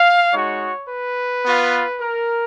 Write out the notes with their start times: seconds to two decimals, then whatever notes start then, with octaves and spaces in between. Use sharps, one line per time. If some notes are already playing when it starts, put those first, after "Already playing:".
Already playing: F5
0.32 G#3 D#4 F#4 C#5
0.89 B4
1.45 B3 F4
2.01 A#4